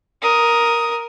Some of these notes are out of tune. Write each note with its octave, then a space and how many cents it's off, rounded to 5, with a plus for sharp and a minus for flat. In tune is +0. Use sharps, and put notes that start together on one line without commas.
A#4 +5 D#6 +5